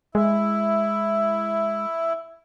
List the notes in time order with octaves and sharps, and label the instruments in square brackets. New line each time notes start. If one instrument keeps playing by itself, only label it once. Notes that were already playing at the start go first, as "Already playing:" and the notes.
[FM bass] G#3 [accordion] E4